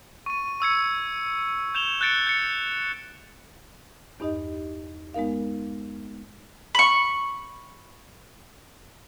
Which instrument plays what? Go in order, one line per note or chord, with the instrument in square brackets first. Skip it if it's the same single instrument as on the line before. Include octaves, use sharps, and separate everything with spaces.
[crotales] C#6 D#7
C#6 E6 G#6 C#7
G6 E7 F7 G7
F#6 G6 A6 C#7 D7
G6 C#7
[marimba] E2 G2 D#4 G4 D#5
G#3 B3 D#4 A#4 F5
[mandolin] B5 C#6